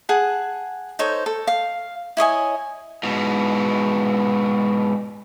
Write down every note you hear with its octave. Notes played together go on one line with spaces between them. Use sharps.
G#4 F#5 A5
D#4 A4 C5 C#5
A4
F5
E4 C#5 D#5 G#5
G#2 B2